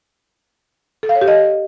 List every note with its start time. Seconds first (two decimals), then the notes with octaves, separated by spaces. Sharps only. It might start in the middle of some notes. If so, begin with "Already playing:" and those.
1.03 A4
1.09 F5
1.15 C#5
1.21 G4
1.28 D#5